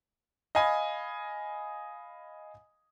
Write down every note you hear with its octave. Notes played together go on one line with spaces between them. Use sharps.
D#5 F5 G#5 B5